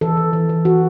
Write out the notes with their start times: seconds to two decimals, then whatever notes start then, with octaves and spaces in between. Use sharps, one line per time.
0.01 E3 A4
0.17 E3
0.33 E3
0.49 E3
0.65 E3 F#4